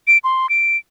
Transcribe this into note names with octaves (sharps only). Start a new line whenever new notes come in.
D7
C6
D7